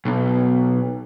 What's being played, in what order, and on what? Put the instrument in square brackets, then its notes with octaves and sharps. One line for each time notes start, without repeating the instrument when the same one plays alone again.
[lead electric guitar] B1